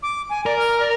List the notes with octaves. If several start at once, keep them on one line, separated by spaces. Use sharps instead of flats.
D6
G#5
A#4 D5
F6
D5